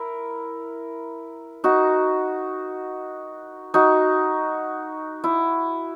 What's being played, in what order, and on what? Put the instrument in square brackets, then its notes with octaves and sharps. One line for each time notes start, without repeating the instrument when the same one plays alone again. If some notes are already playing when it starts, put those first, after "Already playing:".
Already playing: [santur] E4 A#4
D#4 F#4
D#4 F#4
E4